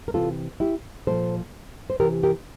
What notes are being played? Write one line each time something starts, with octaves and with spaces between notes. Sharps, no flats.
A#4
C3 E3 F4 A4
E4 G4
A#2 F3 A4 C5
C5
C3 E3 G4 A#4
G4 A#4